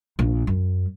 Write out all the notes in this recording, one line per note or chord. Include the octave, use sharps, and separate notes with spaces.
A#1
F#2